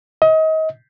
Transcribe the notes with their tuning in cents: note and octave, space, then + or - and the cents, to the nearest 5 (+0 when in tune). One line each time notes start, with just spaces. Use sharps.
D#5 +30